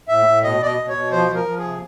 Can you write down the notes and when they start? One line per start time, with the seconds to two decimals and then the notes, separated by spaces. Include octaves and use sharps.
0.08 A2 E5
0.26 A2
0.43 B2 D#5
0.60 B2 D5
0.66 D#5
0.78 B2
0.89 C#5
0.94 B2
1.11 F3 C5
1.29 F3
1.34 A#4
1.45 F3
1.58 G#4
1.63 C3